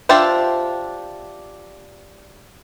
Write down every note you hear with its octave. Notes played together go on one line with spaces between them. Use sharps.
D4 F4 G4 C5 E5